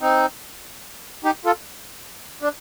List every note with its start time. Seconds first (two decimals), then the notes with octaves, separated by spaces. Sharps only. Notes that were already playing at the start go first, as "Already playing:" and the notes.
0.01 C4 D#4
1.25 D#4 G4
1.45 F4 A4
2.42 D4